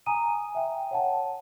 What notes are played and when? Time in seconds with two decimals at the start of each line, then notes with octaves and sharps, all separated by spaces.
0.06 G#5 A#5 D#6 D#7
0.55 E5 G5
0.91 C#5 F#5 A5